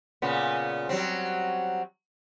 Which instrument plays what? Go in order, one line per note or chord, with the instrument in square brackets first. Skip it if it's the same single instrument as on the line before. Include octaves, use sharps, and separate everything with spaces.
[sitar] A#2 C#3 B3
F#3 G3 C4